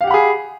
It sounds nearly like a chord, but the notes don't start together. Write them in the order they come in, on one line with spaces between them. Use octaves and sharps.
F5 G4 F#5 B5 G#4